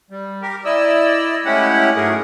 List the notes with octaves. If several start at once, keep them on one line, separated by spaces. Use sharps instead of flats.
G3
G4 A#4
E4 D5 D#5 E6
G#3 A3 C#4 E4 G4 F#5
G#2 F#3 A3 G#4 A#4